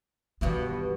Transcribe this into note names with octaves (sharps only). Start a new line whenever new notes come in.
E2 G2 B2 D#3 B3